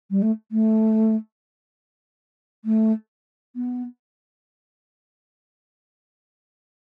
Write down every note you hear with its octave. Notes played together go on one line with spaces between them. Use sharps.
G3
A3
A3
A3
B3